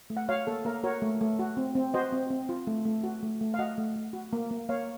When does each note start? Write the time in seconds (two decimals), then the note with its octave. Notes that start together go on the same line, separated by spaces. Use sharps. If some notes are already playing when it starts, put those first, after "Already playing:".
0.10 A3
0.17 F#5
0.29 F#4 C#5 F5
0.47 A#3 A4
0.65 A#3 A#4
0.84 F#4 A#4 C#5
1.02 A3
1.21 A3
1.39 F#4
1.57 C4
1.75 C4
1.94 F#4 C5 D#5
2.12 C4
2.30 C4
2.49 F4
2.67 A3
2.86 A3
3.04 F#4
3.23 A3
3.41 A3
3.54 F5
3.59 F#4 D#5 F#5
3.78 A3
3.96 A3
4.13 F#4
4.33 A#3
4.51 A#3
4.69 A#3 C#5 F5